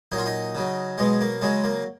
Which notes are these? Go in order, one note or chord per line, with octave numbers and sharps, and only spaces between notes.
A#2 F#3 D#4
F4
D#4
C#3 F#3
B2 F#3 G#3
A#3
C#3 F#3 G#3
A#3